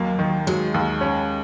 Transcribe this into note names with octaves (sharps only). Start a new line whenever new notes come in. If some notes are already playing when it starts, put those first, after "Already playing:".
Already playing: D#2 F#3 A#3
D#3
F#3 G#3
D#2
C#4